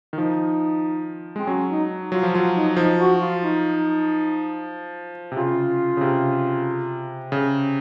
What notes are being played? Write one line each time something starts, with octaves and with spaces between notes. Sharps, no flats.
D#3
F3 D#4
G#3 C4
F#3 C#4
D#4
F#3 F4
F3
F#3 F4
D#4
F3 D#4
F#4
F4
D#4
C3
C#3 F4
C#3
C3
C#3